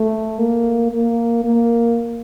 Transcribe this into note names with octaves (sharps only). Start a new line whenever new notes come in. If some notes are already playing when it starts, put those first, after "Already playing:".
Already playing: A3
A#3
A#3
A#3